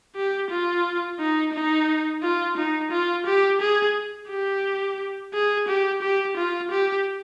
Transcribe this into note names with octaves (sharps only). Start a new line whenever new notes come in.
G4
F4
D#4
D#4
F4
D#4
F4
G4
G#4
G4
G#4
G4
G4
F4
G4